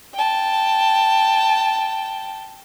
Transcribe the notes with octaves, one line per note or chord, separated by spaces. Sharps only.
G5 A5